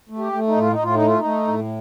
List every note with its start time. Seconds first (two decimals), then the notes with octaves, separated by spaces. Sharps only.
0.09 A3
0.18 G4
0.32 A3
0.48 D#4
0.56 A2 F4
0.72 D#4
0.79 A2 F4
0.94 D#4
1.02 A3 F4
1.18 D#4
1.24 A3
1.47 A2